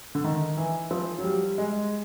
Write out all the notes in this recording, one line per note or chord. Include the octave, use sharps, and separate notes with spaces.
D3
D#3
E3
F3
F#3
G3
G#3